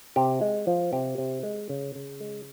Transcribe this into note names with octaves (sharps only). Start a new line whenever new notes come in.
C3 G4
G#3
F3
C3 G4
C3
G#3
C#3
C#3
G#3